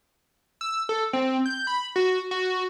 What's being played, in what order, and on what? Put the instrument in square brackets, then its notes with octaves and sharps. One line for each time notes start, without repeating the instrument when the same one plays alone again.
[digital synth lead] E6
A4
C4
G6
B5
F#4
F#4